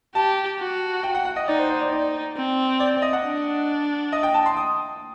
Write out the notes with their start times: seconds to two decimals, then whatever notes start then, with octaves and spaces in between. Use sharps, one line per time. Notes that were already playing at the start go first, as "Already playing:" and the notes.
0.15 G4 A5
0.59 F#4
1.03 G5
1.15 F#5
1.25 F#5
1.36 D#5
1.47 D#4 D5
1.59 C5
1.70 C5
1.81 D5
1.91 D#4 D5
2.36 C4
2.80 D5
2.91 D5
3.02 D#5
3.13 F#5
3.25 D4
4.12 D#5
4.23 G5
4.34 A5
4.46 C6
4.57 D#6